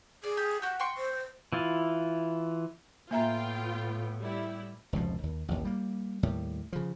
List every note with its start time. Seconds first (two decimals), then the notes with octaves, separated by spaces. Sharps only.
0.24 G#4 D5
0.37 G4
0.62 F#4 G4 F#5
0.80 G5 C6 C#6
0.98 C5
1.52 E3 E4 F4
3.11 A2 A#3 B3 F4 E5 G5 A#5
4.20 G3 E4
4.93 F1 C#2 B2 F3
5.23 D#2
5.48 A1 D#2
5.65 G3 A#3
6.23 D#2 A2 G3
6.73 C#3 F3